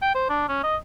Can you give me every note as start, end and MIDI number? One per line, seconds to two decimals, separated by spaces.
0.02 0.14 79
0.15 0.28 72
0.30 0.47 62
0.49 0.63 61
0.63 0.76 75